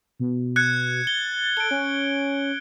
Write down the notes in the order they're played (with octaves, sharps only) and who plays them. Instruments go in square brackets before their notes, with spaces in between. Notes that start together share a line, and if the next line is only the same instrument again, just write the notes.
[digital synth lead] B2
[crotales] F#6 G#6 C#7
[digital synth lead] A6 [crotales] G7
[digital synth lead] A4 [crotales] D7 G7
[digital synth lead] C#4